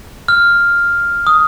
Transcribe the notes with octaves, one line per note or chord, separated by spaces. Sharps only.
F6
D#6